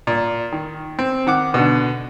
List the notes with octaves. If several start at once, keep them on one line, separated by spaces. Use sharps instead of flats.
A#2
D#3
C4
D#3 F#5 D6
B2 D3